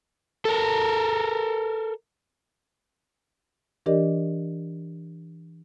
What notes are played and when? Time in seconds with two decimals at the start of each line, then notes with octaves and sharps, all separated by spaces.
0.45 A4 A#4
3.86 E3 D4 G4 A#4 D5 D#5